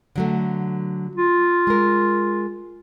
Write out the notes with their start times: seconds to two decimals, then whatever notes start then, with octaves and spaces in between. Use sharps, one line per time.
0.16 D3 F#3 A3
1.15 F4
1.67 G#3 A#4